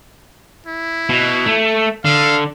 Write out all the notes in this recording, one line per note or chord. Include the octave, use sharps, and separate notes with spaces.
E4
B2
A3
D3 F5